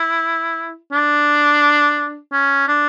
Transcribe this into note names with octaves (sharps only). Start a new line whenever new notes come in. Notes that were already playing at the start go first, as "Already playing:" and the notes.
Already playing: E4
D4
C#4
D4